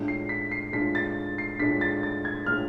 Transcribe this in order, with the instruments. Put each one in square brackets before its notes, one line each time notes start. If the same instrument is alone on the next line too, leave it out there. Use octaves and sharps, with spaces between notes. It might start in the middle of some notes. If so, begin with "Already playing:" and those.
Already playing: [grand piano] A2 G#3 D4 F4
C7
B6
C7
A2 G#3 D4 F4 B6
A6
C7
A2 G#3 D4 F4 B6
A6
A6
G#6
A2 G#3 D4 F4 F6